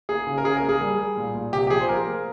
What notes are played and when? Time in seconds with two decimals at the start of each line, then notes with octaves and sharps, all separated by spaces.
0.09 A#3 G#4
0.27 C#3
0.38 A#4
0.44 C#3 G#4
0.57 A#4
0.62 A#3
0.69 G#4
0.81 G3
0.99 G3
1.17 A#2
1.35 A#2
1.53 C3 G4
1.67 G4
1.70 F3 G#4
1.80 C5
1.89 A#3 A#4
2.07 A#3